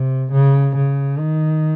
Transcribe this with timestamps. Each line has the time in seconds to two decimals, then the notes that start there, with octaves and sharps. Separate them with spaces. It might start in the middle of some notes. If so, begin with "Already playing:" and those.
Already playing: C3
0.32 C#3
0.76 C#3
1.19 D#3